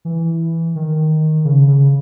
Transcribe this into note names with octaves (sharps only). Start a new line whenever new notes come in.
E3
D#3
C#3
C#3